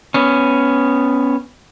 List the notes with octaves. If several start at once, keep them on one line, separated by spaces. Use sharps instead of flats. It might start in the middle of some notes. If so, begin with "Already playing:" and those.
B3 C#4